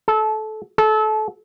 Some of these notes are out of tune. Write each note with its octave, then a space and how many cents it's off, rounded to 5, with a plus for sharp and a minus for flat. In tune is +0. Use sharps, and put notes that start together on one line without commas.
A4 -20
A4 -25